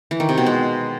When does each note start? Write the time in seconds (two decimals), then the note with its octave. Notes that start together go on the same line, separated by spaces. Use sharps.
0.11 E3
0.20 D#3
0.29 C3
0.38 B2
0.46 G#3